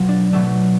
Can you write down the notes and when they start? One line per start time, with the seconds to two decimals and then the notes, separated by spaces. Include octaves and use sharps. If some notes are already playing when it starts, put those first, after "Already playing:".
Already playing: B2 F#3 A3 F4
0.09 D4
0.33 B2 F#3 A3 D4